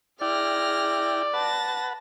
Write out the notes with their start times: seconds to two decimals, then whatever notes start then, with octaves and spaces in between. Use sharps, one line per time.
0.21 E4 G#4 D5 G5 F6 A#6
1.33 B4 F#5 A5 A6 A#6